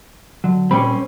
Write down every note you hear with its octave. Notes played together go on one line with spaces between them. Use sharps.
D3 F#3
A#2 G3 C4 C#4 B5